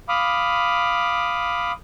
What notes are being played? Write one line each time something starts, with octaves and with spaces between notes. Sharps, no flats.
F5 B5 D6 D#6